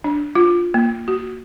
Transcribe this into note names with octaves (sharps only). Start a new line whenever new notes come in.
D4
F4
A#3
F#4